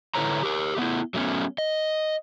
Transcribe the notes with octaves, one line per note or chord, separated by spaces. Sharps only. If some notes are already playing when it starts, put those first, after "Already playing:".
D3 E4 A4 B4 C#5 A#5
G4 A#4
A3 B3 E4
F#3 A3 B3 C#4
D#5